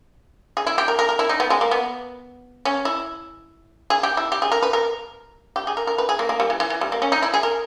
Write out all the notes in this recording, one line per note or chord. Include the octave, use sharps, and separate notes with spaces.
G#4
E4
G4
A#4
A#4
A#4
E4
D#4
B3
G#3
A#3
B3
C#4
E4
G#4
G4
E4
G4
G#4
A#4
B4
A#4
G4
G#4
A#4
A#4
B4
G#4
A#3
A#3
G3
E3
E3
E3
G3
A#3
C#4
D#4
E4
G#4
A#4